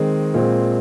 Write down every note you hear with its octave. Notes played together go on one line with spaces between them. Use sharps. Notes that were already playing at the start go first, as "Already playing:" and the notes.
Already playing: D#3 G#3 C4
A#2 G#3 C4